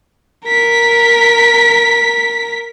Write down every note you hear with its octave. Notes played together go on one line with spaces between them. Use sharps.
A#4 B6